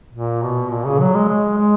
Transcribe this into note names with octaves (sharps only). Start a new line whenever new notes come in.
A#2
B2
A#2
C#3
F#3
G#3
G#3
G#3